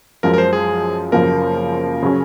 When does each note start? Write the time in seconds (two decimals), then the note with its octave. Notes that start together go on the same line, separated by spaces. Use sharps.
0.23 F#2 F3 G#3 A#4
0.33 A#4
0.38 C5
0.53 G#4
1.12 F#2 C#3 F3 A#3 A#4
2.02 C#3 F#3 C#4